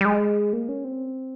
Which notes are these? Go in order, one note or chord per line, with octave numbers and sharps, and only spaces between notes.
G3
G#3
A#3
C#4
C4